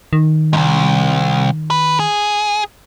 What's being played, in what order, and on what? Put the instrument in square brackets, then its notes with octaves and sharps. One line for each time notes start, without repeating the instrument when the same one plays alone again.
[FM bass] D#3
[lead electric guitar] C2 G#2
B4
G#4